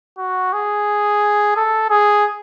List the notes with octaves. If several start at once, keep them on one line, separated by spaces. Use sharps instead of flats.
F#4
G#4
A4
G#4